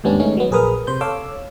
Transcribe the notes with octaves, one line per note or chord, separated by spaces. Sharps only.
D#2 G#2 G3 B3 C#4 D4
D#3 G#3 A3 C#4 D#4
F#3 B3
A#1 G#4 A#4 B4 D#6 F6
C3 C5 G6
A4 C#5 F5 D6 E6